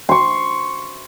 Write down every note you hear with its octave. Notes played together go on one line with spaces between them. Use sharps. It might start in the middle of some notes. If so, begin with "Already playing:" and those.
C6 C#6